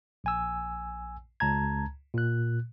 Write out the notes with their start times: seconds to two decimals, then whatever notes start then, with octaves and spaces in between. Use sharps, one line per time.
0.24 A#1 G#5 E6
1.40 C#2 A5 A#5 G#6
2.14 A#2 F#6